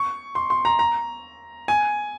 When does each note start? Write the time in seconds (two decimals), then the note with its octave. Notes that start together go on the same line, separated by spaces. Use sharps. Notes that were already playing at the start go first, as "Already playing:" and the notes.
Already playing: C#6
0.35 C6
0.50 C6
0.65 A#5
0.79 A#5
1.68 G#5